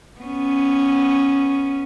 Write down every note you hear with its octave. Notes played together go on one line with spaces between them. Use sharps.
B3 C#4